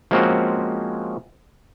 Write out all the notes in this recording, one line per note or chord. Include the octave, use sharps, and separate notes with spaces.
F3 G#3 A#3 C4 C#4 F#4